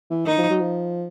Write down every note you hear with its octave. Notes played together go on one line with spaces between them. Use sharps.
E3
D#3 D#4
F3
F#3
F3